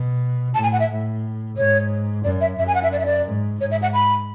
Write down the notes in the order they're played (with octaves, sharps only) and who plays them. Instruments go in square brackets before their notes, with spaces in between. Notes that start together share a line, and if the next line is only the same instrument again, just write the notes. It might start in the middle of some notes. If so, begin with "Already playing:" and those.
Already playing: [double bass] B2
[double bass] A2 [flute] A5
[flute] G#5
F#5
E5
[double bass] A2
[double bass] G#2 [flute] C#5
[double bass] F#2 [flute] D5
[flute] E5
[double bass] F#2 [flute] E5
[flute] G#5
F#5
E5
D5
E5
D5
[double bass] G#2
[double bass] G#2 [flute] C#5
[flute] E5
F#5
B5